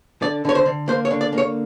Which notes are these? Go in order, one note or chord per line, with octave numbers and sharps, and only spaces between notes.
D3 D5
D3 C#5
C5
D3
A#3 C5
C#5
D3
D5
A#3
C#5